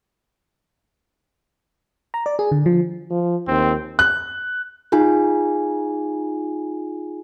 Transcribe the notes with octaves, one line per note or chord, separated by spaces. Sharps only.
A#5
D5
G#4
D3
F3
F3
D#2 C4
F#6
D#4 F4 G#4 G#5